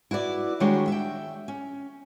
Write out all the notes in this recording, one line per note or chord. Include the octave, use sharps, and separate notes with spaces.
E4 F#4 B4 D5
D#3 G3 G#3 D4 F#4 C#5
E5 G5
C#4